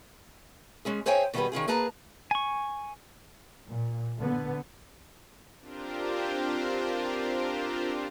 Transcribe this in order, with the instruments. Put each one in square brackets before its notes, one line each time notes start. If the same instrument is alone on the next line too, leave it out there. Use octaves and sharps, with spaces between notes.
[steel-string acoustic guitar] G#3 C#4 G#4
G#4 C5 C#5 E5 G5 G#5
B2 D#3 G3 D#4 G#4 B4
D#3 C#4 F4 G#4
A#3 G#4 B4 A5 A#5
[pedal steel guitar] G#5 C#6
[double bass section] A#2
D3 B3
[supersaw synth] C4 D4 F4 G4 A#4 C5